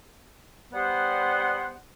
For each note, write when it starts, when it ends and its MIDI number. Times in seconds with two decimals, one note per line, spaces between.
0.73 1.74 55
0.73 1.74 59
0.73 1.74 72
0.73 1.74 78